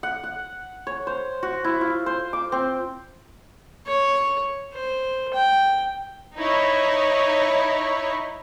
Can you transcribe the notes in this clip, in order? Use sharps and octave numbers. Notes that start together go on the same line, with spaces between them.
F#5
F#5
C#5
C5
F#4
E4
F4
C5
D6
C4
C#5
C5
G5
D#4 E4 C#5